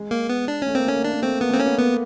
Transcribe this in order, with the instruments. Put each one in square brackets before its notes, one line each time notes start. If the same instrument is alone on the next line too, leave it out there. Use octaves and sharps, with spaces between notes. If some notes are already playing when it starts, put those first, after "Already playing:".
Already playing: [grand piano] G#3
[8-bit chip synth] A#3
B3
D4
[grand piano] A3 [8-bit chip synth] C#4
[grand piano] A#3 [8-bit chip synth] C4
[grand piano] A3 [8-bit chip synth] C#4
[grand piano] A#3
[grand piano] A3 [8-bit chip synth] D4
[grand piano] A#3
[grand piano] A3 [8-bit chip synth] C4
[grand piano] A#3 [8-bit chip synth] B3
[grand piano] A3
[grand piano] A#3 [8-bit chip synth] C4
[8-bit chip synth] C#4
[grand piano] B3
[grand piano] A#3 [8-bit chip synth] B3